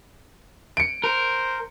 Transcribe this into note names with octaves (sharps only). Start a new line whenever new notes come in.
C#7 D7
A#4 C5